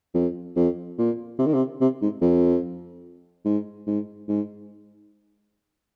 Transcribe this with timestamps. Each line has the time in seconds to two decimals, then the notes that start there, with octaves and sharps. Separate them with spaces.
0.14 F2
0.56 F2
0.98 A#2
1.38 C3
1.46 D#3
1.54 C3
1.81 C3
2.01 G#2
2.21 F2
3.45 G#2
3.87 G#2
4.28 G#2